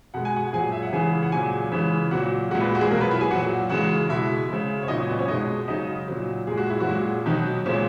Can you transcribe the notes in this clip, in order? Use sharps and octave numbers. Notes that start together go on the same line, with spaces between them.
B2 G#3 F#5
G#5
F#4 F#5
A#2 F#3 G#4 G#5
E5
F#5
C#3 E3 G#3 G#4 G#5
F#5
A#2 F#3 G#4 G#5
C#3 E3 G#3
A#2 F#3 F#4 F#5
A#2 G#3 F#4 F#5
B3 B4
F#4
G#3 G#4
B2 F#3 A#3 A#4
B3 B4
E4 E5
G#4 G#5
A#2 F#3 F#4 F#5
C#3 E3 G#3 F#4 F#5
B2 G#3 E4 E5
C#3 G#3
C#5
A#2 F#3 D#4 D#5
C#4 C#5
B3 B4
C#4 C#5
B2 G#3 D#4 D#5
C#3 F#3 D#4 D#5
A#2 F#3
A#2 G#3 G#4
F#4
E4
F#3 F#4
A#2 G#3
B2 D#3 F#3 D#4
A#2 C#3 G#3 C#4